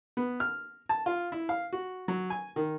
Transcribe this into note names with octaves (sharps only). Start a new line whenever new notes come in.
B3
F6
A5
F4
E4
F5
F#4
F#3
G#5
D#3